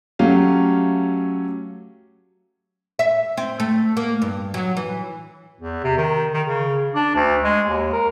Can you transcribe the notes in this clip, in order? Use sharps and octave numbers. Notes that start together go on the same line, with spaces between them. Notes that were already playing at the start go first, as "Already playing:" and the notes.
F#3 A3 C#4 G4 F5
E5
C4
A3
A#3
G2
F#3
E3
E2
C3
D#3
D#3
C#3
D4
D2
G#3
D#2
A#4